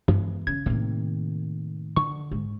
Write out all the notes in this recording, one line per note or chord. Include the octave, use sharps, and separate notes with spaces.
G2 E3 G#3 B3
C#3 G#6
A2 C3 D#3 A#3
D3 C#6
G#2